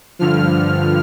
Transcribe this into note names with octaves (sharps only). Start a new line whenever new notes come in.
G2 D3 F3 F6